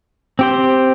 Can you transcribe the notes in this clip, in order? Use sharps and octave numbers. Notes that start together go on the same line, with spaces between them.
C4 G4 C5